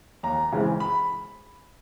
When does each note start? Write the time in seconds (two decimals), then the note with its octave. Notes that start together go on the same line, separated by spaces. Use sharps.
0.23 D#2 A#5
0.52 C#3 E3 G#3 C4
0.80 B5